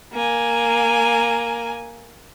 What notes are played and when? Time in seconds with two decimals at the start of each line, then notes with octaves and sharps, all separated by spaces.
0.13 A#3 G#5